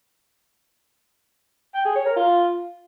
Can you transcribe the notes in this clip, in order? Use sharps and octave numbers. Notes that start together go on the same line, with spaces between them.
G5
G#4
C#5
A#4
F4